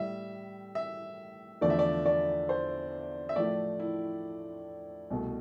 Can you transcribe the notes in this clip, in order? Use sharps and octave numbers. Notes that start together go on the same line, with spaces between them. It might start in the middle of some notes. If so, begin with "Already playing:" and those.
Already playing: A2 G3 E5
E5
E2 D3 F3 A3 D5
E5
D5
D5
C5
E5
A2 F3 A3 D5
E4
C2 B2 A3